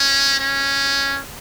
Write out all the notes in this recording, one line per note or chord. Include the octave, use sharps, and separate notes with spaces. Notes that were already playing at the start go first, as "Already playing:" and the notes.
Already playing: C#4
C#4